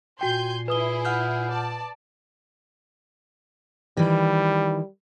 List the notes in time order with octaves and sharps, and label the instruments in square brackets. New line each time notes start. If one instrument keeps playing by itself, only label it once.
[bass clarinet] A#2 [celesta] F#4 G5 [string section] G#5 C6 G6
[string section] E4 G#4 [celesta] B4 D#6 G7
[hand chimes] F#5 F6 G6
[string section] D5 A5
[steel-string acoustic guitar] D#3 E3 [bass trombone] G3